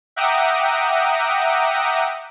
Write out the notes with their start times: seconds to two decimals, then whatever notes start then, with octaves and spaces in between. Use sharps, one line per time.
0.16 E5 F#5 G5 A#5 D6 D#6